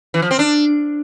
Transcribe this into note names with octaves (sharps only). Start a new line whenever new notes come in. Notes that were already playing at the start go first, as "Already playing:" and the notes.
E3
F3
C4
D4